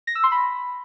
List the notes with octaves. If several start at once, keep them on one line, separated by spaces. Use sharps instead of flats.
A#6
E6
C6
B5